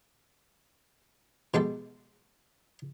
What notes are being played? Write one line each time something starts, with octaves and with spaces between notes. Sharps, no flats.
B2 G#3 G4 A4